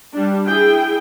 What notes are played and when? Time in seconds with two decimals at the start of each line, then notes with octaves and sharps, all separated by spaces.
0.13 G3 D4
0.46 E4 G#4 G5